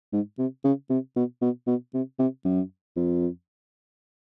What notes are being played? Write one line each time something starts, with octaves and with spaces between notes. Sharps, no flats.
G#2
C3
C#3
C3
B2
B2
B2
C3
C3
F#2
F2